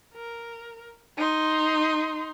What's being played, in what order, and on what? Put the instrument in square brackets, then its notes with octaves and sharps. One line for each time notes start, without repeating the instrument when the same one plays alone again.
[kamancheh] A#4
D#4 C6